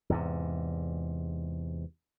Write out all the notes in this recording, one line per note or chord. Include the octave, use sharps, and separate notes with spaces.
E2 G#2 C3